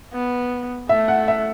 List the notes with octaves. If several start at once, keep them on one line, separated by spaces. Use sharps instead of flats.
B3
A3 E5
F#5
E5